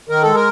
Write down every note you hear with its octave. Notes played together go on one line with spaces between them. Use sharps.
D#3 A#4
G#3 A4
A#4